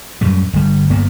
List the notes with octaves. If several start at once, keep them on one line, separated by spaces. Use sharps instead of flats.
F#2 A2 G3
G1 G3
G1 G2 A#3 B3